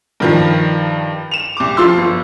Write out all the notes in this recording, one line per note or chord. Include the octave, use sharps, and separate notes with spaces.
G2 D#3 F3
E7 F7
C2 D6
F3 F4 C6 E6
G1